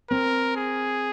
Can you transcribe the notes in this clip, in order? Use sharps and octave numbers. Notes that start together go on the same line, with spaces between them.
C4 A#4
G#4